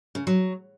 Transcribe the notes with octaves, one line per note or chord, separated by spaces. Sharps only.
C#3
F#3